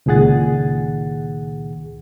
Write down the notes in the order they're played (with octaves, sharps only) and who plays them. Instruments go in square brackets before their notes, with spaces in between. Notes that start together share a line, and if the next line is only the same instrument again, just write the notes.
[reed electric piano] C#2 A#2 D#3 G#4 F#5 A6